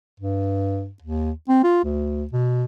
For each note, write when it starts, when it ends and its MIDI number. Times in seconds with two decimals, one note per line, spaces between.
0.20 0.91 43
1.02 1.31 39
1.49 1.61 60
1.64 1.81 65
1.84 2.26 38
2.32 2.65 47